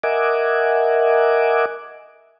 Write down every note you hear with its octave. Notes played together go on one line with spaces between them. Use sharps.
A#4 D#5 E5 F#5 G#5 D6